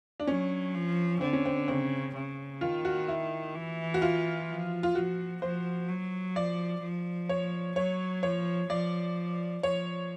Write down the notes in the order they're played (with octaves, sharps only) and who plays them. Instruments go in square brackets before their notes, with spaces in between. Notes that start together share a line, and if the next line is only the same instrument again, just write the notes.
[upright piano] D4
[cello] F#3 [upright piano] C#4
[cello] F3
[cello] D3 [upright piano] C4
[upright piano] C#4
C4
[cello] C#3 [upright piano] C4
[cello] C#3
[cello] D#3 [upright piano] F4
[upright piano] F#4
E4
[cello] E3
[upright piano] F#4
F4
[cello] F3
[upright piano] F4
[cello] F3 [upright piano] F#4
[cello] F3 [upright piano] C5
[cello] F#3
[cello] F3 [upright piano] D5
[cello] F3
[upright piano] C#5
[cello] F#3 [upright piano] C#5
[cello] F3 [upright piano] C#5
[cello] F3 [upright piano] D5
[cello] F3 [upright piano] C#5